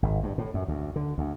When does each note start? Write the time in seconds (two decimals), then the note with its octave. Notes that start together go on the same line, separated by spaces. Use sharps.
0.02 G#1
0.23 G2
0.38 A2
0.54 F#2
0.68 D2
0.96 D3
1.18 D2